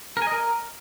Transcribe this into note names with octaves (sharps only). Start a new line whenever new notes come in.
A#4
G#5
D#5
A#4